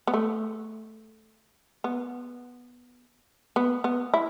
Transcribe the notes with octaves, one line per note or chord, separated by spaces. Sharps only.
B3
A3
B3
B3
B3
E4